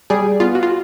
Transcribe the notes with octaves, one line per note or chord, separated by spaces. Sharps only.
G3 G#4
B3 F4
F#4
F4